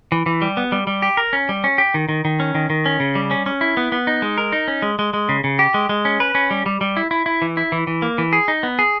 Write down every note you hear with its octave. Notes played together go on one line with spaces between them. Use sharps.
E3
E3
G3
B3
G3
G3
G4
A#4
C#4
G3
C#4
G4
D#3
D#3
D#3
C#4
D#3
D#3
C#4
C#3
G3
C#4
C#4
E4
B3
B3
D#4
G#3
A#4
D#4
C#4
G#3
G#3
G#3
C#3
C#3
G4
G#3
G#3
C#4
B4
C#4
G3
G3
G3
E4
E4
E4
E3
E4
E3
E3
A#3
E3
G#4
D#4
B3
G#4